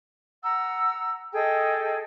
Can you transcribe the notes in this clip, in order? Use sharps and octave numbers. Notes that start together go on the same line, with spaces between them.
F#5 A#5 E6
G#4 A4 D#5 G5